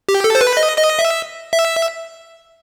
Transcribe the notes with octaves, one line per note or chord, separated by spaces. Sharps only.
G4
A4
C5
B4
D#5
D#5
E5
E5